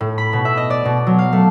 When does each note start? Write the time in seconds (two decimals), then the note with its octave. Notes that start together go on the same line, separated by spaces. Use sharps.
0.01 A2
0.18 B5
0.33 B2
0.45 E5
0.57 D#5
0.70 D5
0.85 B2
1.07 F#3
1.19 F5
1.33 A3